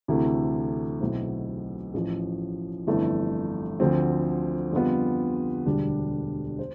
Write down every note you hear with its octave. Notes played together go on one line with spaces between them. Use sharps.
D2 C3 E3 A3 E4
B1 B2 A3 C4 E4
A1 A2 F3
G1 F2 E3 A3 E4
D2 D3 F3 C4
F2 D3 G3 B3 F4
E1 D2 D3 G3 D4
C5